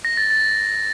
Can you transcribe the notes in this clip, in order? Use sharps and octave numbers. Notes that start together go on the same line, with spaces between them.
A#6
A6
A6